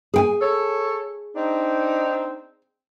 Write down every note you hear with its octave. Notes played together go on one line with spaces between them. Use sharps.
G#4 G5 G#5
A4 C#5
C4 D4 D#4